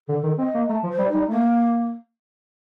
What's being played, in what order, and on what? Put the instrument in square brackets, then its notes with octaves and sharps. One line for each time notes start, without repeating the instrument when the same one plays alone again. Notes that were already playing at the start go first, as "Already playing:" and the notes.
[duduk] D3 [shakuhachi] A4
[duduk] D#3
[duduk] C4 [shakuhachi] D#5
[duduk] A#3
[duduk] A3 [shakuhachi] A#5
[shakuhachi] A5
[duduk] F3
[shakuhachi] C5
[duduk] G3
[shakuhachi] D#4
[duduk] G3
[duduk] A3 [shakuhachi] A#3